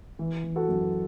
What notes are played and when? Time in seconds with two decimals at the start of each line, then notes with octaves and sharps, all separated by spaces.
0.19 E3
0.44 E3
0.56 F#4 A4
0.69 F#2